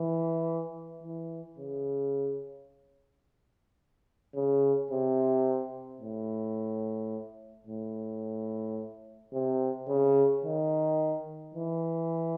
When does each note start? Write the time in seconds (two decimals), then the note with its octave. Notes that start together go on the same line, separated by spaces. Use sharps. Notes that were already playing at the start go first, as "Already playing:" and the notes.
Already playing: E3
1.03 E3
1.58 C#3
4.35 C#3
4.91 C3
6.01 A2
7.67 A2
9.33 C3
9.88 C#3
10.44 D#3
11.54 E3